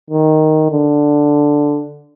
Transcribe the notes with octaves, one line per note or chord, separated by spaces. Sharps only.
D#3
D3